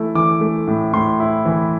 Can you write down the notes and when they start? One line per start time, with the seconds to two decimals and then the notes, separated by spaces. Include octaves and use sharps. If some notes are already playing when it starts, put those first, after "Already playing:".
Already playing: E3 A3 E4
0.15 E3 D6
0.41 A3
0.67 A2
0.93 A2 C6
1.20 E4
1.45 E3